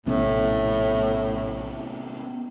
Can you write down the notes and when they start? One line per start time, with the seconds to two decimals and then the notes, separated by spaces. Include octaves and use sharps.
0.06 A#1 A2 C3 B3 C#4